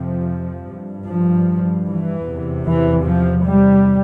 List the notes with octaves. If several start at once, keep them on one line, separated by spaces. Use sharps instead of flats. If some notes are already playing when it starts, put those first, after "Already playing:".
Already playing: F2 C3 F3
G2
F3
E3
E2 C3
E3
F3
G3